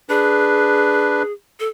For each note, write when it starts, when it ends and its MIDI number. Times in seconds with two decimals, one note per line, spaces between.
0.09 1.23 62
0.09 1.32 68
0.09 1.23 71
1.60 1.68 69